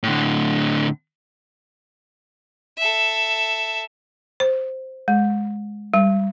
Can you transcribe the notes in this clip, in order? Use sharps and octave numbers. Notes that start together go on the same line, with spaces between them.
A2 D3
A4 E5
C5
G#3
G3